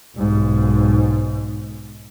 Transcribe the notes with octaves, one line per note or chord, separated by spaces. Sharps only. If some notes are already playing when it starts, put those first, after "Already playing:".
B1 G#2